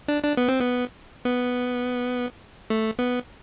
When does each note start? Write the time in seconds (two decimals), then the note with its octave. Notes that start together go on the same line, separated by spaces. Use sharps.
0.08 D4
0.23 D4
0.37 B3
0.48 C4
0.59 B3
1.25 B3
2.70 A3
2.99 B3